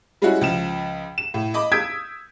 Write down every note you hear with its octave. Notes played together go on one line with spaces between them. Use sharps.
G3 G#3 C#4 E4 F#4
C#2 F3 E7
E7
A2
D#5 B5 D6
D#6 E6 G6 G#6 B6 D7